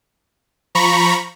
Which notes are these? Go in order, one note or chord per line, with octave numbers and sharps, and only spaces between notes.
F3 A#5 B5 C#6